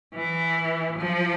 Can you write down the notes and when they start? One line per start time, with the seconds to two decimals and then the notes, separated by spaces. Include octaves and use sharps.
0.14 E3
0.98 F3